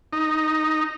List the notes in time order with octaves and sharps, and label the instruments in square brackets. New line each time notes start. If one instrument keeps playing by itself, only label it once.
[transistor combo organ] D#4